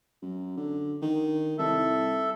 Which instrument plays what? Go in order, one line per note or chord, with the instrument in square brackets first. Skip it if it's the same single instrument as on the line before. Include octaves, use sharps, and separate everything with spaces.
[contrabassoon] F#2
D3
D#3
[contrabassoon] C2 [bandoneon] A4 E5